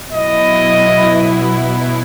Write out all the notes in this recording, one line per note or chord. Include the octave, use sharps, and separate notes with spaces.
B2 F#3 B3 E4 D#5